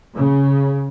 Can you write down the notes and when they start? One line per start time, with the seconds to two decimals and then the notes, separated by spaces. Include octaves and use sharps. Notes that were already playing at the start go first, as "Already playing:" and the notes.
0.16 C#3